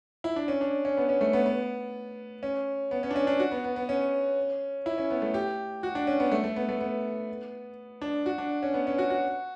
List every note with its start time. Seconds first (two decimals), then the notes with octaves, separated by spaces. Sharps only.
0.24 E4
0.36 D4
0.48 C#4
0.61 D4
0.85 C#4
0.97 B3
1.09 C#4
1.21 A3
1.33 B3
1.46 B3
2.43 C#4
2.91 B3
3.03 C#4
3.11 D4
3.16 C#4
3.27 D4
3.40 F#4
3.51 B3
3.64 B3
3.76 B3
3.89 C#4
4.86 E4
4.98 C#4
5.10 B3
5.22 A3
5.34 G4
5.83 F#4
5.95 D4
6.07 C#4
6.20 B3
6.32 A3
6.44 A3
6.56 B3
6.69 A3
6.80 B3
8.02 D4
8.26 F#4
8.38 D4
8.63 C#4
8.74 B3
8.87 C#4
8.98 F#4
9.10 F#4